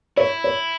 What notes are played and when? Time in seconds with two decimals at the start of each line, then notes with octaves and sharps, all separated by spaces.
0.17 E4 C#5
0.44 C#5